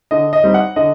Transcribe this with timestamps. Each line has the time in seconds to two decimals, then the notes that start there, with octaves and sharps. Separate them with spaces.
0.11 D3 D#5
0.33 D#5
0.44 G3 C4 D#4
0.54 F#5
0.76 D3 D#5